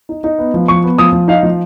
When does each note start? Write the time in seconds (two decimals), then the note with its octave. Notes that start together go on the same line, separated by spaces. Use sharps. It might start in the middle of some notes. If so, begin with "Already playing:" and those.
0.09 D#4
0.24 D#4
0.39 B3
0.54 F3
0.68 F3 C#6
0.84 B3
0.98 F3 D#6
1.13 F3
1.28 D#4 F5
1.43 F3